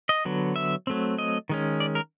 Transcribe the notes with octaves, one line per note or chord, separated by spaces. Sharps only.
D#5
D3 F#3 B3
E5
F#3 A3 C4
D#5
D#3 G#3 C#4
D5
A#4